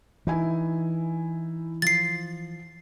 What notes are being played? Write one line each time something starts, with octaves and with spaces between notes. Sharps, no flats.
E3 D#4 E4 G#5
F3 A6 C7